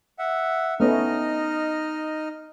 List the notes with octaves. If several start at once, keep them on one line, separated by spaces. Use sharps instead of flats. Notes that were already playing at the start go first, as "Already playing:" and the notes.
E5 F#5
A3 B3 C#4 D#4 D#5 F6